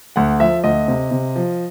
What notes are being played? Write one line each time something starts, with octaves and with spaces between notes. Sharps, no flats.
D2 F#5
F3 E5
D2 D#5
C3
C3
F3